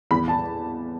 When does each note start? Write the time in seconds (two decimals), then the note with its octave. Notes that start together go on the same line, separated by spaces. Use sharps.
0.11 E2 B5
0.28 A5